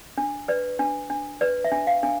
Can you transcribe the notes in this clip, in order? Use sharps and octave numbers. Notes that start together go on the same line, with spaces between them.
D4
B4 D5
D4
D4
B4 D5
E5
D4
F5
D4